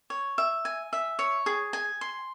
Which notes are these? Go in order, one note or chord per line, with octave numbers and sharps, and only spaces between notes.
C#5
E5
G#5
E5
C#5
G#4
G#5
C6